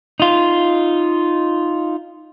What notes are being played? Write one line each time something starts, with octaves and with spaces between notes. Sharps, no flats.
D#4 F4